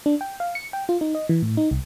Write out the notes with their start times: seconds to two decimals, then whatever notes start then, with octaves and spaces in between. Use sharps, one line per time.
0.06 D4
0.21 G5
0.40 F5
0.55 C#7
0.73 G5
0.89 F4
1.01 D#4
1.15 D#5
1.29 E3
1.42 A2
1.57 D#4
1.71 C2